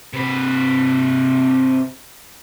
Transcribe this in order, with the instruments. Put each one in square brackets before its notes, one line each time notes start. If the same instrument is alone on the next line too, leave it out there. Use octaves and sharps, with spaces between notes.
[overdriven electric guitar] C3 B4